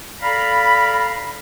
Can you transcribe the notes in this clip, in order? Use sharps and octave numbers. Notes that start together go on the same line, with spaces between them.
A4 D5 F5 A#5 B5